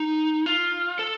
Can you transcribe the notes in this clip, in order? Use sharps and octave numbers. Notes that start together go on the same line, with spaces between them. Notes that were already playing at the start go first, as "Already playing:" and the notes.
Already playing: D#4
F4
A4